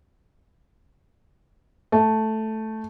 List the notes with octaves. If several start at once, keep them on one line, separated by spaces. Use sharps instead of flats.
A3